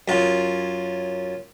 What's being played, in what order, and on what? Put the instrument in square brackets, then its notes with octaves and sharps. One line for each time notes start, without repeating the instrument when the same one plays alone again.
[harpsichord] F#2 F4